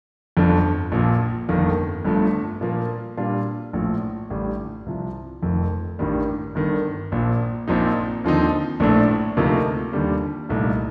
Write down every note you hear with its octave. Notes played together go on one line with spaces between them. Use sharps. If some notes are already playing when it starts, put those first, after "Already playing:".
G1 F2 D3 F3
A#1 A#2 F3
G1 F2 D#3 A#3
G1 G2 F3 A3
A#2 F3 A#3
A#2 G3 D4 F4
A#1 A2 F3
A1 G2 D3 G3
C2 C3 F3
F1 F2 D#3
A1 G2 D#3 G3
G1 G2 D#3
A#1 A#2 F3
A#1 A#2 F3 C4 D#4
D#2 D3 F3 C4 D#4
A#1 A2 A3 D4
D2 C3 F3 A#3 D#4
D#2 D3 G3
C2 A#2 A3 D#4